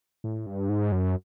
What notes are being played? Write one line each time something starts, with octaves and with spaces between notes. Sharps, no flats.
A2
G2
G#2
F#2